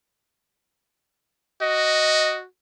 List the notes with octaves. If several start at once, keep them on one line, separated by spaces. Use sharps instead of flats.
F#4 D#5